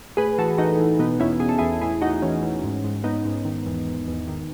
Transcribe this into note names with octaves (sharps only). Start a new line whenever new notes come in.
A2 G#4 B4
E3 F#4 A4
E3 D#4 F#4
E3
B2 B3 D#4
E2 C#4 E4
B2 G#4
A4
E2 E4 G#4
A2 E4 G#4
A2 D#4 F#4
E3 C#4
E3
G#2
G#2
G#2 B3 D#4
G#2
D#3
E2
E2
E2
D#3